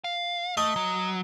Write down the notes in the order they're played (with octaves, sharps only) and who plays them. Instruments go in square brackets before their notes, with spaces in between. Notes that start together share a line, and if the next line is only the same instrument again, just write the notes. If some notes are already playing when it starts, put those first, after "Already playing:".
[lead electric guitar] F5
[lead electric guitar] A3 [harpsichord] D#5
[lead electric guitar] F#3